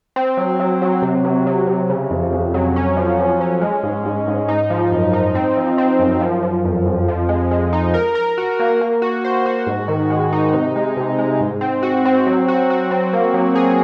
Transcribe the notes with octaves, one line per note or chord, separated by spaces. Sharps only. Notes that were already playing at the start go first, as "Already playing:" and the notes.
C4
F#3
F#3
F#3
C3
C3
F#3
C3
C#3
F2
F2
F#3
C#4
F3
F3
C#4
G#3
G#2
G#2
G#2
D#4
F3
F#2
D#4
C4
F3
C4
F#2
F3
F3
F2
F2
F3
G#3
G#3
D#4
A#4
A#4
F#4
A#3
A#3
F#4
C5
F#4
G#2
D#3
G#3
D#4
C3
G#3
C3
G#3
G#2
C4
F#4
C4
F#3
F#4
F#4
C4
A#3
F#3
G#4